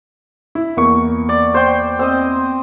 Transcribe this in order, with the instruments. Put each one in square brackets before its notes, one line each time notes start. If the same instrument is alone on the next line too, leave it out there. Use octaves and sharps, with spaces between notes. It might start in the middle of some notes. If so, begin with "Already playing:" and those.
[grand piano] E4
E2 A#3 C#6
[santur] D5
C5 G5
C4 C5 D#5